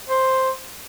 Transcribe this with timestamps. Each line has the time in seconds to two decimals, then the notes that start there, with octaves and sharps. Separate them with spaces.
0.09 C5